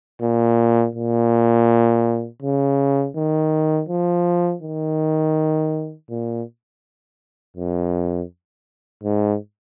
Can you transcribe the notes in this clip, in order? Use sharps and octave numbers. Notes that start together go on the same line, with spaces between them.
A#2
A#2
C#3
D#3
F3
D#3
A#2
F2
G#2